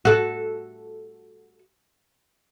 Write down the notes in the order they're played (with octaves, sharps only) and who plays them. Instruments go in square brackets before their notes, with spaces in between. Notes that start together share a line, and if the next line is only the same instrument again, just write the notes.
[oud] F#4 A4